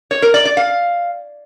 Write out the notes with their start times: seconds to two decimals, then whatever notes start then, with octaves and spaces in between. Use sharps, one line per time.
0.11 C#5
0.22 A#4
0.34 D5
0.45 D5
0.57 F5